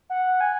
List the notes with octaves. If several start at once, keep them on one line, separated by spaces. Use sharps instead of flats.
F#5
G#5